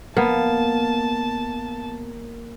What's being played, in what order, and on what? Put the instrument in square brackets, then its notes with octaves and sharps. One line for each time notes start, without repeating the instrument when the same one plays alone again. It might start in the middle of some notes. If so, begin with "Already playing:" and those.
[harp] A#3 [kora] B3 [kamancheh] A5